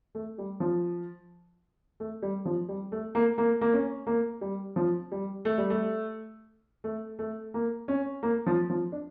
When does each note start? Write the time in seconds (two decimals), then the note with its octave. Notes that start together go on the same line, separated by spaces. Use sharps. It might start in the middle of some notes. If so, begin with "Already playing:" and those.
0.15 A3
0.38 G3
0.60 F3
2.00 A3
2.22 G3
2.45 F3
2.69 G3
2.92 A3
3.15 A#3
3.38 A#3
3.61 A#3
3.73 C#4
4.07 A#3
4.41 G3
4.76 F3
5.12 G3
5.45 A3
5.58 G3
5.70 A3
6.84 A3
7.19 A3
7.54 A#3
7.88 C#4
8.23 A#3
8.47 F3
8.70 F3
8.92 D4